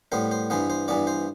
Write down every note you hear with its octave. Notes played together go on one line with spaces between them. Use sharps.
A2 G3 B3 C5
C5
G2 E3 B3 C5
C5
G2 E3 B3 D5
C5